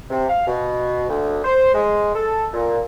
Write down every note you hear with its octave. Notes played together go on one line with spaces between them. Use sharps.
C3
F5
B2
D2
C5
G#3
A4
A#2